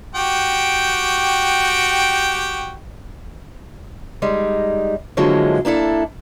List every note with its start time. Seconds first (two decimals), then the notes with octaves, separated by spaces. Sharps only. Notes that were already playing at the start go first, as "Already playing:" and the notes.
0.15 F#4 G4 G5
4.22 G3 G#3 D#4
5.17 D3 F3 F#3 G#3 A#3 E4
5.65 A#3 D4 E4 A4